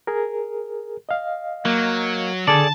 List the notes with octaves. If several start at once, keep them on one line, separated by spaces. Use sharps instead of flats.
G#4 A#4
D#5 F5
F#3 A#3
D3 G#4 A4 D5 A5